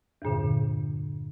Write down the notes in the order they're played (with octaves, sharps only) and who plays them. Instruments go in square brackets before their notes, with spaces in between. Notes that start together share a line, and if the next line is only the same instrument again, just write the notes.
[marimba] E2 G2 A#2 D3